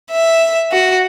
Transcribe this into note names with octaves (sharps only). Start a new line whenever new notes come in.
E5
F#4